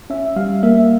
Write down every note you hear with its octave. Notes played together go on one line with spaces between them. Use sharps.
C#4 E5
G3 F5
A#3 E5